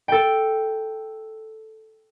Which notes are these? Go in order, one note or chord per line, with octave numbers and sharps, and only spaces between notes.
A4 G5